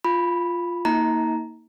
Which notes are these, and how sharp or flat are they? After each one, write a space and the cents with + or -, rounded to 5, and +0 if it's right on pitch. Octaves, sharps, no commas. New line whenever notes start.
F4 +0 B5 +0
A#3 +0 D#4 +40 A#5 +0